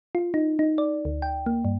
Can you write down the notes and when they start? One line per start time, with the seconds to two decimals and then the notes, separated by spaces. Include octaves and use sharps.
0.15 F4
0.34 D#4
0.59 D#4
0.78 D5
1.05 D2
1.22 G5
1.46 A#3
1.65 G2